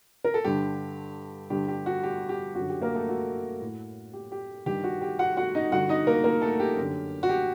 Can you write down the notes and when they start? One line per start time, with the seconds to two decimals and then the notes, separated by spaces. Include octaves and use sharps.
0.25 A#4
0.34 A4
0.44 G2 D3 G4
1.50 G2 D3 G4
1.68 G4
1.86 F#4
2.03 G4
2.29 G4
2.55 F#2 F#4
2.60 D3
2.70 G4
2.82 A#3 A#4
2.95 A3 A4
3.09 F#4
3.61 A2
4.14 G4
4.32 G4
4.66 G2 D#3 G4
4.84 F#4
5.02 G4
5.19 F#4 F#5
5.37 F#4 F#5
5.55 D#4 D#5
5.71 G2 D3 F#4 F#5
5.89 D#4 D#5
6.07 A#3 A#4
6.24 A#3 A#4
6.41 A3 A4
6.60 G4
6.77 F#2 D3
7.23 F#4
7.29 G4